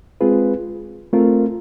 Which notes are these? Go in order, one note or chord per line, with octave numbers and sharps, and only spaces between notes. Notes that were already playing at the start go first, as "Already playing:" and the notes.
G#3 C4 F4 G#4 B4
A3 C4 F4 A#4